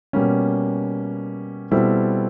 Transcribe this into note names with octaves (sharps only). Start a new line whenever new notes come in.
B2 G3 A#3 C#4
B2 G3 C4 E4 A4